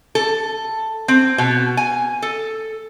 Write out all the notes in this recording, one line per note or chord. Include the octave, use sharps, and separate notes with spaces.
A4
C4
B2
G#5
A4